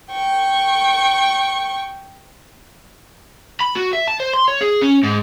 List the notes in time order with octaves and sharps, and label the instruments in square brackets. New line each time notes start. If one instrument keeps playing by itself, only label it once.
[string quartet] G5 C#6
[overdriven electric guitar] B5
F#4
E5
A5
C5
C6
C#5
G#4
C#4
G#2